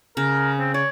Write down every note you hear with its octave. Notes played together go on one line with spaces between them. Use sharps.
C#3 A#4
C4
C#5 D5